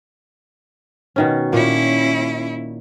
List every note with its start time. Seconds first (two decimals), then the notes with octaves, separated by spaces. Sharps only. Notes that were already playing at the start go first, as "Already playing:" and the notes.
1.16 B2 D#3 C#4
1.53 A#2 C#4 E4